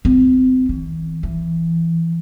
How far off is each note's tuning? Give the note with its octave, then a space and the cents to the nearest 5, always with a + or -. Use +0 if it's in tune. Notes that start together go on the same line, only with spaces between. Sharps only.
C4 -30
E3 -35
E3 +10